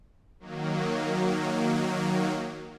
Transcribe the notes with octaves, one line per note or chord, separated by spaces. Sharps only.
D#3 F#3 A#3